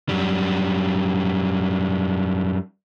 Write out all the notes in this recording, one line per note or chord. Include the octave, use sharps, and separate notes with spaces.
F#2 G3